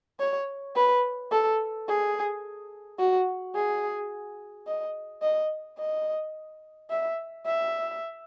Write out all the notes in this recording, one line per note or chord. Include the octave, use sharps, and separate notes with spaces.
C#5
B4
A4
G#4
F#4
G#4
D#5
D#5
D#5
E5
E5